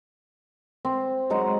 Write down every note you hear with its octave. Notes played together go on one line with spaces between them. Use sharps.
C4
F#3 G#3 D#4 F#5